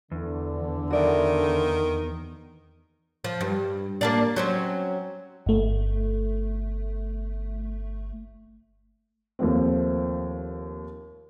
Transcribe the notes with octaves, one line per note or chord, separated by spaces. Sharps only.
E2 D3
D#3 F#4 D5 E5
F3
G2
A#3 D4 D5
F#3 C4 C#4
G1 A3
D#2 F3 A3 C4